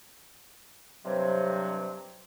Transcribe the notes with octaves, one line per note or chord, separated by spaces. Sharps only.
G2 C3 F#3